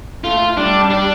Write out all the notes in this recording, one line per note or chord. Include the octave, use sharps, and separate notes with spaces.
A3 F4
G3 D4
D4